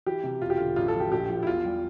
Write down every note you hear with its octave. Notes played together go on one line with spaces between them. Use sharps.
E3 G4
C3
E1 F4
G4
D3 F4
A1 F4
A4
F3
G4
A#1 G4
F3
E4
E2 F4
G3